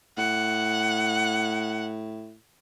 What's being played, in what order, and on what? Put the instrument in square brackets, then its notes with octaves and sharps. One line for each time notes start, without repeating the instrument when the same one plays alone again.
[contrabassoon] A2 [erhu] F#5